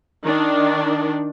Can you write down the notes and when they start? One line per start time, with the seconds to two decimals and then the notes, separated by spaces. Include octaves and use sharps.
0.23 D#3 D4